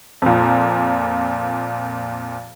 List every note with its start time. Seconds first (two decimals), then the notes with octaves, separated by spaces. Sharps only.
0.22 F2 A#2